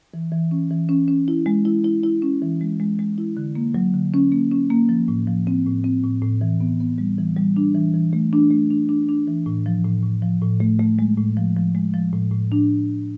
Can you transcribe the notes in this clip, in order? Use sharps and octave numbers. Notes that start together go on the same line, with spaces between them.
E3
E3
C#4
E3
C#4
C#4
E4
G#3
E4
E4
E4
C#4
E3
G#3
G#3
G#3
E4
D3
A#3
F#3
D3
C#4
A#3
C#4
A#3
F3
A2
F3
C4
A2
C4
A2
A2
E3
B3
B3
G3
E3
G3
D4
E3
E3
A3
D4
A3
D4
D4
D4
E3
A2
F3
A2
A2
F3
A2
A3
A3
G#3
A2
F3
F3
G#3
F3
A2
A2
D4